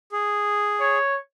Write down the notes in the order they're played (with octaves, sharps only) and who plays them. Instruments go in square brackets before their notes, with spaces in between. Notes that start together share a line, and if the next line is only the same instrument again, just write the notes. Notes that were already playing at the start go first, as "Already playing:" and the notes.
[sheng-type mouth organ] G#4
[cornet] C#5